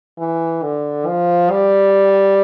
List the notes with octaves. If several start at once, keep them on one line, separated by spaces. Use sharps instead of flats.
E3
D3
F3
G3